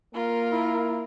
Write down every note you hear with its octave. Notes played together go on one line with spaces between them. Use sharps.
A#3 F4 A#4
E4